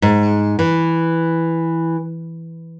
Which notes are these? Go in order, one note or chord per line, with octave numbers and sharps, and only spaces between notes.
G#2
E3